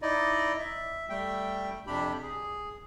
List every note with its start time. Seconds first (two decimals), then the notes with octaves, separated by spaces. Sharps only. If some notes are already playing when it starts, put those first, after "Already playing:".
0.02 D#4 E4 D5 D#5
0.58 E5
1.10 G3 A3 E5 G5
1.87 F2 C3 D4 G4 B5
2.22 G#4